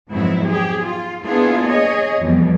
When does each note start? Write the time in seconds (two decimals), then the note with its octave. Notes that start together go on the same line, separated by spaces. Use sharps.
0.10 F2 G#2 B2 F#3 C4 E4
0.49 G4 G#4
0.84 F4
1.24 A#3 B3 D4 E4 F4 G#4
1.69 G#4 C#5 D#5
2.19 F2 B2 E3 G3